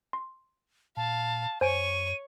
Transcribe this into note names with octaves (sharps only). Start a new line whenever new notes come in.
C6
A#2 F5 A5
F#2 C5 C#5 G#5 C#6 D7 D#7